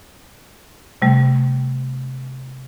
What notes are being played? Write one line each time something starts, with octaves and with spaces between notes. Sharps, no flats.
C3 G3 A3